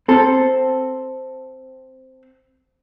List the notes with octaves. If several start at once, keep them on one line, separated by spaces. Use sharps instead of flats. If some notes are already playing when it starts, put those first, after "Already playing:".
C4 A4